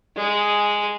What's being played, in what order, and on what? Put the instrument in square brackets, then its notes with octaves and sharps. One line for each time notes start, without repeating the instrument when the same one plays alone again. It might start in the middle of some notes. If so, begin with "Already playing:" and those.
[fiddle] G#3 G#4